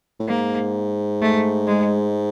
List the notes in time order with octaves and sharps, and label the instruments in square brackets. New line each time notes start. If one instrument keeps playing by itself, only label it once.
[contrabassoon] A2
[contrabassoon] G#2 [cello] A#3
[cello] A3
G#3